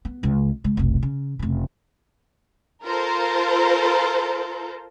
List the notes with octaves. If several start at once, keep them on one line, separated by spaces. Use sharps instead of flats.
B3
C#2 C#3
C#3 G#3
F1 B1
C#3
F1 C#3
F4 A4 A#4 C5